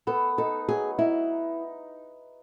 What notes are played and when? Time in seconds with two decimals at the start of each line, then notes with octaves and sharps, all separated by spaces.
0.07 B3 A4
0.38 D#4 A4
0.68 F#3 G#4
0.99 D#4 E4